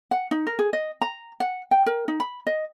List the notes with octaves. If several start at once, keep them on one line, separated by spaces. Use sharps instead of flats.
F#5
D#4
A#4
G#4
D#5
A#5
F#5
G5
A#4
D#4
B5
D#5